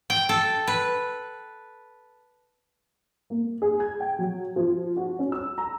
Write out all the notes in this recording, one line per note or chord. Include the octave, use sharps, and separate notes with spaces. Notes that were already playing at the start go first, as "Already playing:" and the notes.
G5
A4
B4
A#3
G#4
G#6
G5
F#3
F3
F#4
C#4
E6
A#5